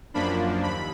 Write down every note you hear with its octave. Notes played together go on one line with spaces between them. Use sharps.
F#2 F3 A#3 D4 B5
D#2 B5